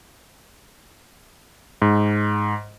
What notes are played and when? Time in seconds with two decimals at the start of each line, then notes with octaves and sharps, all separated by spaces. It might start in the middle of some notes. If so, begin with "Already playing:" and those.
1.82 G#2